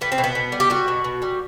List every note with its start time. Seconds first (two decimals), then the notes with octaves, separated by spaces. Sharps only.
0.01 G3 B3
0.12 C4
0.18 B2
0.24 B3
0.35 B2
0.52 G3
0.60 G4
0.70 G3 F#4
0.88 B2
1.04 B2
1.22 G3